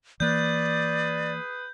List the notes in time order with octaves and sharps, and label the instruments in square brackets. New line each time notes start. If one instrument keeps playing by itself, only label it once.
[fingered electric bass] E3 A#3 [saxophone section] G#4 B4 [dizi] D5 [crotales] G6